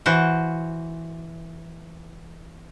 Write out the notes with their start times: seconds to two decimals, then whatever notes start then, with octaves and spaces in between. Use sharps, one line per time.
0.06 E3 F#4 C5